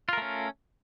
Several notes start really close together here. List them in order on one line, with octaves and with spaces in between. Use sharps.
F4 A#4 A3 C#4